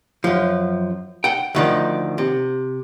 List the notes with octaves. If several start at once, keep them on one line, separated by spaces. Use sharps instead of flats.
F#2 F3
F#5 G5
D2 D#3 F3
C3